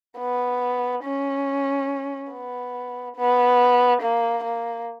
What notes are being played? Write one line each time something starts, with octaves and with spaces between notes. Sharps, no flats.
B3
C#4
B3
B3
A#3
A#3